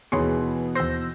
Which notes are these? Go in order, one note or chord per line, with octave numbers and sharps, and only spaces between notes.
D#2 B2 E3 G#4 B4 C#5 C6
D#2 C5 E6 G6 A#6